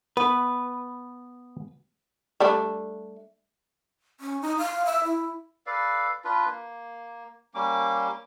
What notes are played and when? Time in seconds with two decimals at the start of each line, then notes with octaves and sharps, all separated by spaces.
0.17 B3 B4
2.40 G3 A3 D4
4.20 C#4
4.42 D#4
4.58 F5
4.86 E5
5.04 E4
5.67 A4 B4 D5 F5
6.24 D4 F4 B4
6.46 A#3
7.54 G3 A#3 C#4 D6